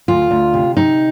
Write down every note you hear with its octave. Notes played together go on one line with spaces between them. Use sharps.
D2 F4
D2
C3
C3 D#4